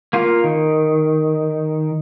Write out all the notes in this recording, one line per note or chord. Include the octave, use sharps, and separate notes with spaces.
A#3 F4
D#3